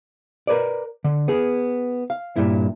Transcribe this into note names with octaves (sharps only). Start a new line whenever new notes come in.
A#4 B4 D5
D3
B3 G#4
F5
G2 A#2 E4